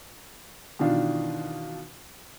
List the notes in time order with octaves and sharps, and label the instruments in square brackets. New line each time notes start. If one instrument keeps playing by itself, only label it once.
[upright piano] B2 D#3 E3 D4 F4